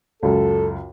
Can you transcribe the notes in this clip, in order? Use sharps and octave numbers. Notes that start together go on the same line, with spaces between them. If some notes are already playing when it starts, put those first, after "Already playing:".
C#2 F#2 A4